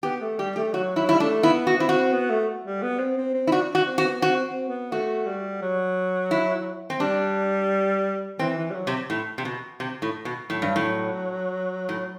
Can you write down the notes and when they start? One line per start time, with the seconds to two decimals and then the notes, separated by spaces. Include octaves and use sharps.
0.03 B3 G4
0.21 A3
0.38 G3 G4
0.56 A3 G4
0.73 F#3 F#4
0.96 F#3 E4
1.09 G3 E4
1.20 A3 D4
1.43 B3 E4
1.67 F#4
1.78 C4 E4
1.89 F#4
2.13 B3
2.30 A3
2.64 G3
2.82 B3
2.99 C4
3.17 C4
3.34 C4
3.47 E4
3.52 D4 F#4
3.75 F#4
3.86 C4
3.98 F#4
4.04 B3
4.22 C4 F#4
4.45 C4
4.68 B3
4.92 A3 F#4
5.26 G3
5.62 F#3
6.31 E4
6.90 C4
7.00 G3 D4
8.39 E3 C4
8.58 E3
8.71 G3
8.74 F#3
8.87 C3
9.10 A2
9.38 C3
9.45 B2
9.80 C3
10.02 A2
10.25 B2
10.49 A2 F#3
10.62 G2
10.76 A2
11.89 A2